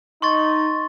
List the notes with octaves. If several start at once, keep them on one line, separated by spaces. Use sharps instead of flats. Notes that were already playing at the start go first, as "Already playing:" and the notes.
D#4 C6 C#6 A6